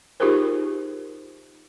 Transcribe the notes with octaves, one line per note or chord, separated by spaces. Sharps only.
D#4 F4 G4 G#4 A#4 C5